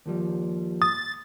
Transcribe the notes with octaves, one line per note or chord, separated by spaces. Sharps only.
D#2 F3 G3
D#6 A6